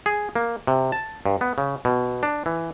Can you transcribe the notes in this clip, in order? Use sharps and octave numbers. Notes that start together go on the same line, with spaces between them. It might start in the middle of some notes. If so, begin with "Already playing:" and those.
G#4
A#3
C3
A5
G2
B3
C#3
B2
D4
E3